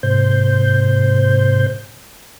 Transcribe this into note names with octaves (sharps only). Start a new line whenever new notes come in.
G#2 C3 C5 G6